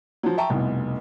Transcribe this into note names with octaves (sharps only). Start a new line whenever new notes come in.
F3 F#3
E5 G5 A5 A#5 C#6
F1 C2 B2